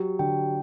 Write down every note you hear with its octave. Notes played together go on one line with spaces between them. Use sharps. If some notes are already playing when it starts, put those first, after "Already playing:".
Already playing: F#3 G4
D3 G5